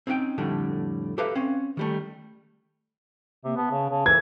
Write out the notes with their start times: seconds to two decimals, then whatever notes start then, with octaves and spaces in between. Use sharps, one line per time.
0.07 C4 C#4 D#4 F5 G5
0.38 F2 A2 D3 G3 A3
1.18 G4 A4 B4 E5 F5 A#5
1.35 C4 C#4 F5
1.77 D#3 G3 A3
3.44 C3 A#3
3.56 B3 A5
3.71 C#3
3.90 C#3 A5
4.06 E3 A4 G#6